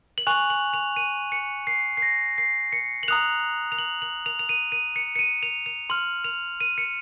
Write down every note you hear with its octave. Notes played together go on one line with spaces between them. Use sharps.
F#7
G#5 C#6 F#6 F7
F#7
F7
D#7
C#7
C7
C7
A#6
C7
C#7
F#7
A#5 D#6 F#6 F7
F7
F#7
F#7
F7
F7
D#7
D#7
C#7
C#7
D#7
F7
F7
C6 F6 F#7
F7
D#7
C#7